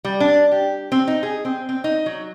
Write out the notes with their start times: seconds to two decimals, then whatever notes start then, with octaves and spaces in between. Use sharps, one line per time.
0.05 G3
0.20 D4
0.52 G4
0.92 C4
1.07 D#4
1.23 G#4
1.45 C4
1.69 C4
1.84 D#4
2.06 F#3